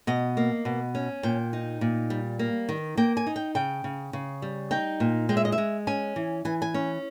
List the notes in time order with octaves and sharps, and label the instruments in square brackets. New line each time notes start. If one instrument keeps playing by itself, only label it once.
[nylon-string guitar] B2 D#5
A#3
B2
C#4
A#2 G5
D#4
A#2
G3
A#3
D#3
A#3 G5
G#5
D#4
G5
C#3 G5
C#3
C#3
G3
D#4 G5
A#2
G#3 G5
E5
D#5
E5
G#3
C#4 G#5
E3
E3 G#5
G#5
C#4